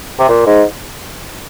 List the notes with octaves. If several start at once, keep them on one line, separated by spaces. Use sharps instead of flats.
C3
A#2
G#2